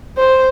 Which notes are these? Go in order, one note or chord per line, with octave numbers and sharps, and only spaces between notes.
C5